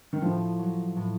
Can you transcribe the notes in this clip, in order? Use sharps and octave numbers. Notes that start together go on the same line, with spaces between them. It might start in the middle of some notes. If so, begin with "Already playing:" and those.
D#3
A2 F3
F#3
A2